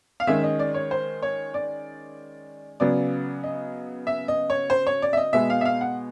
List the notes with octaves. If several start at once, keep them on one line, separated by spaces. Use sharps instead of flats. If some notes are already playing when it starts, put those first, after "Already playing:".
F5
D#3 G#3 C#4 E5
D#5
D5
C#5
C5
C#5
D5
C#3 F#3 B3 D5
D#5
E5
D#5
C#5
C5
C#5
D5
E5
D#5
B2 G#3 B3 E5
F5
E5
F5
F#5